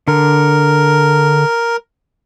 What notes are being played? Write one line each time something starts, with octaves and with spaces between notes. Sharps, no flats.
D3 A#4